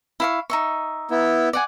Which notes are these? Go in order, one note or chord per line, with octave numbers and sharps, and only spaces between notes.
E4 F5 C#6
D#4 E5 C#6
B3 E4
D5 F#5 G#5